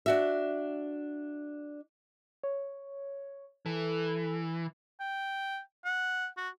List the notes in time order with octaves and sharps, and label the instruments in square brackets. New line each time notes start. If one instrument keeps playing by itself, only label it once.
[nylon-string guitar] D4 F#4 E5
[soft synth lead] C#5
[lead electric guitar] E3 [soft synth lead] A4
[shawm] G5
F#5
F#4